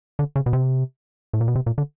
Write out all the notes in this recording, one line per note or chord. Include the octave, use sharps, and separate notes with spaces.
D3
C#3
B2
C3
A2
A#2
B2
C3
A#2
D3